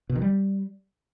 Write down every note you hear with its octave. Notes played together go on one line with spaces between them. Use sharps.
B2
D#3
G3